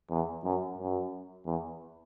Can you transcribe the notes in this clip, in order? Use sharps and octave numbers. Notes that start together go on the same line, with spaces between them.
E2
F#2
F#2
E2